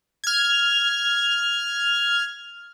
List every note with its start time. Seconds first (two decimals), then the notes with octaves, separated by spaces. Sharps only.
0.24 F6 G#6